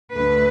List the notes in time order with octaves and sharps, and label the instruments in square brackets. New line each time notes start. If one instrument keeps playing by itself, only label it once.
[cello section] D2 D3 A3 B4